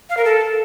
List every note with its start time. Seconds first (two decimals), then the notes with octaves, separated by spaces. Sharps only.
0.10 F5
0.17 A#4
0.25 A4